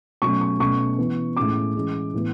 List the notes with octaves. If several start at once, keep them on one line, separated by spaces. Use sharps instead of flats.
B2 F#3 A3 C#4 C#6
C#6
B2 A3 C#4 C#6
E3 B3
A2 G#3 C#4 D6
E3 G#3 C#4
A2 E3 B3